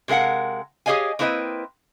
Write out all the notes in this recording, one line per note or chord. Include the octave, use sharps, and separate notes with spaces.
C3 G#3 A#4 F5 F#5
G4 G#4 C#5 D#5 F5 G#5
A#3 C4 E4 B4 D#5 G5